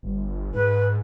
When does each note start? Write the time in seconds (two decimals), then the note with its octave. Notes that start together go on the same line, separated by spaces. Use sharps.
0.03 G1
0.54 G#2 B4